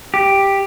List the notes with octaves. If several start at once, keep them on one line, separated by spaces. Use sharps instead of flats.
G4